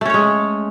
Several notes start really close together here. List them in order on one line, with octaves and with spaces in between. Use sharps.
A3 C#4 C#5 G#3